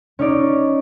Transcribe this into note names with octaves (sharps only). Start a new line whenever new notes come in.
C#4 D#4 D5